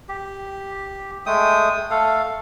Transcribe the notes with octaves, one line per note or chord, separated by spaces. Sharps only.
G4
G#3 A3 G5 D#6
A3 A4 F5